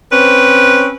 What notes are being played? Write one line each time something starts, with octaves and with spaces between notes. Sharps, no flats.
C4 C#4 B4